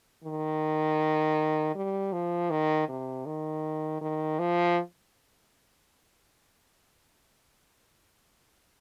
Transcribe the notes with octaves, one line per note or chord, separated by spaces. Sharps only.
D#3
G3
F3
D#3
C3
D#3
D#3
F3